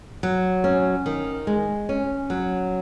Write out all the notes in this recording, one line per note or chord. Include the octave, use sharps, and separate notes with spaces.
F#3
C#4
D#3
G#3
C#4
F#3